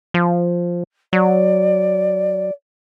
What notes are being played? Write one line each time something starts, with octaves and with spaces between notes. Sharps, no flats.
F3
F#3 D5